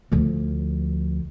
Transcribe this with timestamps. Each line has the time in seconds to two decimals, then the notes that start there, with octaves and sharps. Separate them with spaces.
0.12 D2 F3